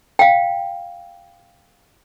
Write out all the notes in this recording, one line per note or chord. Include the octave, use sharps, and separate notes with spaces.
F5 G5